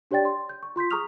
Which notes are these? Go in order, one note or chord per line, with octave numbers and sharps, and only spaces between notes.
D4 G4 C#5 D5 G5 A6
C6
G6
C#6
F4 C6 G6 B6
G#4 A#5 C#6 D#6 F6 F7